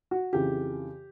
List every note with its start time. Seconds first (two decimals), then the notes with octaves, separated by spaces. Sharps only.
0.11 F#4
0.33 F2 C#3 E3 G4